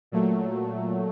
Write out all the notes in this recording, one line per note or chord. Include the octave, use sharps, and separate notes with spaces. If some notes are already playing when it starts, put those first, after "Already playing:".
A#2 F#3 A3